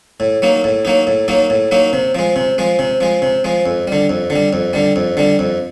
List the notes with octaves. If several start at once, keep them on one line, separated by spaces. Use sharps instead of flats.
A2
F#3 A#3 D#4
A2
F#3 A#3 D#4
A2
F#3 A#3 D#4
A2
F#3 A#3 D#4
C3
F3 G#3
C3
F3 G#3
C3
F3 G#3
C3
F3 G#3
F2
D3 G3
F2
D3
G3
F2
D3 G3
F2
D3 G3
F2